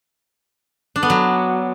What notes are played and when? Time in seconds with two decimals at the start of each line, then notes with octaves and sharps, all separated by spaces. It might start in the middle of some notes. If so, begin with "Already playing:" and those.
0.96 D4
1.03 B3
1.10 F#3